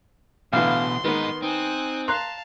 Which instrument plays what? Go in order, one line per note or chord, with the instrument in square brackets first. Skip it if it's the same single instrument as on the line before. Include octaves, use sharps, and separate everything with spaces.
[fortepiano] A1 D3 E3 [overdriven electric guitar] B2 [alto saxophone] F5 [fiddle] C6
[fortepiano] D#3 B3 [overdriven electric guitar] G#3 D#4 [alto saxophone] B4
[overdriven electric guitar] C4 [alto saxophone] D#4 [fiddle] G#5 F#6
[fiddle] F5 A5 [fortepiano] A#5 C6 F#6